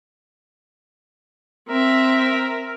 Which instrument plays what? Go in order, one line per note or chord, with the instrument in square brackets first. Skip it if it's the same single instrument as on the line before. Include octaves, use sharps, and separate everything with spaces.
[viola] C4 E5 [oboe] A#4